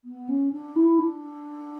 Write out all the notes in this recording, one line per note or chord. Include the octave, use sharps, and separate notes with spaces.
B3
C#4
D4
E4
D4